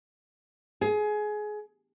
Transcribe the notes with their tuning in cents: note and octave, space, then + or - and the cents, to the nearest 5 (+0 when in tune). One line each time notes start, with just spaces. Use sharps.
G#4 +20